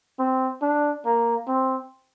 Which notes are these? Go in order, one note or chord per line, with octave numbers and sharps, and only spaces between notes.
C4
D4
A#3
C4